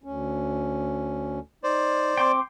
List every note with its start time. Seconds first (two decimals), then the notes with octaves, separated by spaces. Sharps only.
0.04 D2 C#4
1.64 D#4 C5 D5
2.18 C4 G5 C6 D6